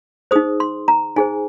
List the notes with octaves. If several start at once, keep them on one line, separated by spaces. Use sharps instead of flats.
D#4 G#4 C5 D#6
C6
A#5
D#4 G#4 C5 G#5